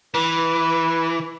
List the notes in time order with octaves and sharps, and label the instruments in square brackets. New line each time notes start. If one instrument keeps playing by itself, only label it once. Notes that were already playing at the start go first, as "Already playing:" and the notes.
[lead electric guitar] E3 [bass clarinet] B4